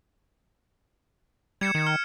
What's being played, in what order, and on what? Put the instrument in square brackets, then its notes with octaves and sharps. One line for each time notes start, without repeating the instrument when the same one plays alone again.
[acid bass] G3 [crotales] G#6 C#7 E7
[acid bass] D#3
[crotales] F6